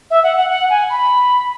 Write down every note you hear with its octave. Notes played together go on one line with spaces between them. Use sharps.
E5
F#5
F#5
F#5
G#5
B5